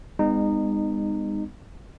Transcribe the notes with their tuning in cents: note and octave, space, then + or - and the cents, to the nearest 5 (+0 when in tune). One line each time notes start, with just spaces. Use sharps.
G#3 -35 B3 +30 D#4 -20